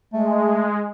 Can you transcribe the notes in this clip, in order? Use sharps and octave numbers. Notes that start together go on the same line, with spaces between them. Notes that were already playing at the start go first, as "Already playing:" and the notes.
G#3 A3